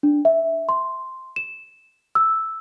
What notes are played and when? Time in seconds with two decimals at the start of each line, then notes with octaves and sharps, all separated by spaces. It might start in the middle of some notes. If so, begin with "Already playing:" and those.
0.03 D4
0.25 E5
0.69 C6
1.36 E7
2.15 E6